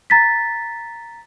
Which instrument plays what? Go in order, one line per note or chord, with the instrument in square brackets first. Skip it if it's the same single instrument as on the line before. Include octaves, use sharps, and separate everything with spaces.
[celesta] A#5 A6 B6